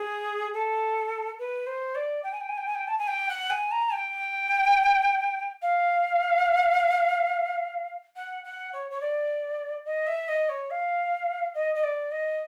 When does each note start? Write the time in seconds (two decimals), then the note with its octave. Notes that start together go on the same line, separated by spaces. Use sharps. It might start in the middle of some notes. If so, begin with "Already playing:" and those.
Already playing: G#4
0.54 A4
1.39 B4
1.67 C5
1.95 D5
2.24 G5
2.32 G#5
2.41 G5
2.49 G#5
2.58 G5
2.66 G#5
2.75 G5
2.88 A5
2.99 G#5
3.08 G5
3.29 F#5
3.50 G#5
3.72 A#5
3.93 G5
5.62 F5
8.16 F#5
8.44 F#5
8.73 C#5
8.90 C#5
9.01 D5
9.85 D#5
10.07 E5
10.28 D#5
10.49 C#5
10.71 F5
11.55 D#5
11.75 D#5
11.83 D5
12.11 D#5